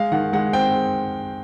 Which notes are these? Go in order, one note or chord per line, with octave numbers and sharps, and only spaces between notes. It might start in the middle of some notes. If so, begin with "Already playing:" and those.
Already playing: G#3 F5
D#3 F#5
G#3 F#5
C4 G5